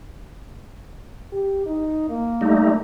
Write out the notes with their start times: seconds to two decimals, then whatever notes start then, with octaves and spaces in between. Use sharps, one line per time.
1.32 G4
1.66 D#4
2.10 A#3
2.41 G3 A3 D#4